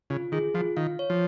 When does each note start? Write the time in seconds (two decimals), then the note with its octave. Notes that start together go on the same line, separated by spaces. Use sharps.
0.10 C#3 F4
0.32 D#3 G#4
0.54 F3 F4
0.77 D#3 F5
0.99 C#5
1.10 F3